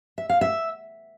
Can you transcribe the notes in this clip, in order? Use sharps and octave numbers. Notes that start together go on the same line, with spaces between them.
E5
F5
E5